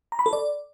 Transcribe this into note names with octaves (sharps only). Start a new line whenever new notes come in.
A#5
B5
A4
D5